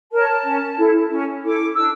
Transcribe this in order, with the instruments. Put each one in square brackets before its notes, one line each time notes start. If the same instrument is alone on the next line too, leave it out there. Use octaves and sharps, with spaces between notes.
[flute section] A#4 C#5 A5
C#4
E4 A4
C#4
E4 A4 D6
D4 E6